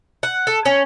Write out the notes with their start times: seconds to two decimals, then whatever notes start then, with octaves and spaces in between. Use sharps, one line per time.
0.23 F#5
0.47 A4
0.65 C#4